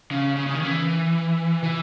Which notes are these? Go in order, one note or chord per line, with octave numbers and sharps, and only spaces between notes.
C#3
C#3
C#3
D#3
E3
E3